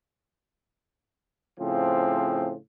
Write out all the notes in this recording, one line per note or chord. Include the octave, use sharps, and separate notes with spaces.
A2 C#3 F3 C4